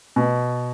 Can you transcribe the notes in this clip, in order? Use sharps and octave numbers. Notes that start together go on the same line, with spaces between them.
B2